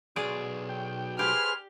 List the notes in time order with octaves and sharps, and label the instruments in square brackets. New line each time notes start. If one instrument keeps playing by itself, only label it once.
[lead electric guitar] B1 [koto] G#4 D5
[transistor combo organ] G5
[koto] G4 [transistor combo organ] G#4 B4 C5 [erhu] F6